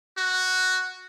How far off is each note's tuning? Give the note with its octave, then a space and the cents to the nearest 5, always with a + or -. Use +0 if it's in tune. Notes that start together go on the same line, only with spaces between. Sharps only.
F#4 +0